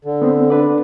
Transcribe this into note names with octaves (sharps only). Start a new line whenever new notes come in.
D3
B3 C4
D4 B4 D5